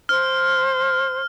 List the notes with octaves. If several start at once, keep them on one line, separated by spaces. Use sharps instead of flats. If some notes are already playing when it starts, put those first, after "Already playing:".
C5 F6